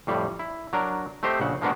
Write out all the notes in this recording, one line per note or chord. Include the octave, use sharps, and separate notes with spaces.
F2 A2 G3
E4
F#3 D4 A#4
A3 C4 G4 C5 D#5
A#1 C#3 F#5
F3 G#3 A#3 B3 D4 F#4